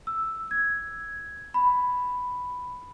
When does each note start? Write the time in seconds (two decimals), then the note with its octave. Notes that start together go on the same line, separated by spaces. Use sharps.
0.07 E6
0.51 G#6
1.54 B5